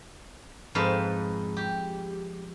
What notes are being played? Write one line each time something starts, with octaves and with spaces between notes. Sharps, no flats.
F2 G#2 B4 F5 A5
G4